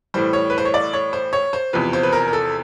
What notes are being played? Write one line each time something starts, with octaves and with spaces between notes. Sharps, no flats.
A2 E3 G3 C5
C#5
B4
C5
C#5
D5
C#5
C5
C#5
C5
E2 C3 F3 B4
C5
B4
A#4
A#4
A4